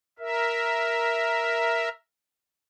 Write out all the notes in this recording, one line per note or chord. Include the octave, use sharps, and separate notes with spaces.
A#4 E5